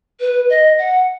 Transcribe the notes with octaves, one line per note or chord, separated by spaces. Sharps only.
B4
D#5
F#5